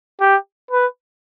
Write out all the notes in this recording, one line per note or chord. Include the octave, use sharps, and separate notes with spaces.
G4
B4